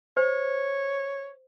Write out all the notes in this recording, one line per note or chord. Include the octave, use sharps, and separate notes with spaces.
C5 C#5